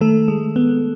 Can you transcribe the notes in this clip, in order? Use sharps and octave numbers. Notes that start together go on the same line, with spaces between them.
D#3 A3 A4
G#3
B3